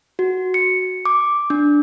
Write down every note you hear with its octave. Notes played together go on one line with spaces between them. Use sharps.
F#4
C#7
D6
D4